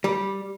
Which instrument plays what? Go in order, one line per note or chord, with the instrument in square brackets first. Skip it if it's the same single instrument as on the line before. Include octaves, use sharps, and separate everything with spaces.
[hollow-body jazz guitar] G3